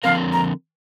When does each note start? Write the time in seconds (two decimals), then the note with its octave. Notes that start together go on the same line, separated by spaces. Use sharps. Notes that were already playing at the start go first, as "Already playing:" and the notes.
0.04 D3 F3 C4 A#4 F5
0.33 A#5